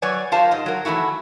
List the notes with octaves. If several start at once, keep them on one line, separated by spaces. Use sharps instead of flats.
F#3 B4 C#5 D5 G#5
F4 G4 A#4 C5 F5 A5
G#2 D#5
F#3 A#4
E3 G#3 A3 E4 F#4